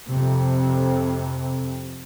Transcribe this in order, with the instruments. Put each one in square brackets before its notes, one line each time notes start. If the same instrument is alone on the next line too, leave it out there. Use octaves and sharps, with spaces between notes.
[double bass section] F2 C3